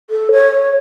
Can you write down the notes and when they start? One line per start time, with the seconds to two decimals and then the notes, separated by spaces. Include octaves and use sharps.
0.10 A4
0.32 C#5